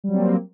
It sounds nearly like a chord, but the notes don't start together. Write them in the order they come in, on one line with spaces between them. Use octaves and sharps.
G3 F#3 C4 A#3